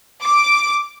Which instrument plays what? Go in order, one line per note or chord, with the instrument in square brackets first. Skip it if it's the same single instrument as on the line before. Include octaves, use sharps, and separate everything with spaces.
[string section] D6